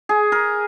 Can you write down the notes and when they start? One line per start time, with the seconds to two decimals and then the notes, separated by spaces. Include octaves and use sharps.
0.09 G#4
0.32 A#4